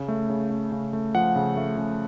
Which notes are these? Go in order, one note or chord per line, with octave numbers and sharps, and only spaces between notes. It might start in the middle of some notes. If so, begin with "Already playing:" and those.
Already playing: C#3
A3
C#3
A3
C#3
A3
F3 F#5
C#3
A3
C#3